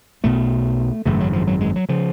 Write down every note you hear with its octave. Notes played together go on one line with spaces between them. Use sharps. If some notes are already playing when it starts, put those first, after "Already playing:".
B1 B2 A3
G#1 F#2 C#3 A3
F#3
F3
F#3
G#3
F#3
C#3 F3